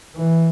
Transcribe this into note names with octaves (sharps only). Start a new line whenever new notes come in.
E3